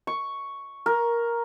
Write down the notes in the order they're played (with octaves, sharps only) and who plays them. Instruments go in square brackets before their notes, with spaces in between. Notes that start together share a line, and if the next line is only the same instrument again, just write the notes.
[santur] C#6
A#4